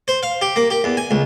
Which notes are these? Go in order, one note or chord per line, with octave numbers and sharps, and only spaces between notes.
C5
F5
G4
A#3
G4
E2
G#5
C#2